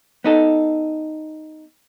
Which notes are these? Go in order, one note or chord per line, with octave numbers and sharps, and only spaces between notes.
B3 D#4 A4